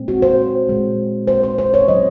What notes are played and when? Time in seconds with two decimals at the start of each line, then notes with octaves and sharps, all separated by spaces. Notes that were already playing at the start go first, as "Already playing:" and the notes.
Already playing: A#2 G#3 C4
0.08 F#4
0.22 C5
0.68 A#2 G#3 C4
1.28 C5
1.43 C5
1.58 C5
1.74 C#5
1.88 A#2 F#3 C4 D#5